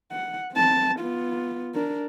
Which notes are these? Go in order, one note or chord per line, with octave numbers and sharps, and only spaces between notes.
F#5
C4 A5
B3 F4
D4 A#4